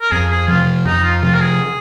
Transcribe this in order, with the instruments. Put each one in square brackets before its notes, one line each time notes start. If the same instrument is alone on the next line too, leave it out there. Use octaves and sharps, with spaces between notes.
[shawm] A#4
[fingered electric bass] F2 [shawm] G#4
[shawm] G#4
[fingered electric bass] C3 F3 [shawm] F4
[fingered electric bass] F2 [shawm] D#4
[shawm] F4
[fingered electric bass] C3 F3 [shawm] F4
[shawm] A#4
G#4